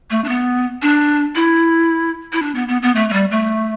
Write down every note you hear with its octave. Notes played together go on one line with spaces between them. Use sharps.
A3
D4
B3
D4
E4
E4
D4
B3
B3
B3
A3
A3
G3
A3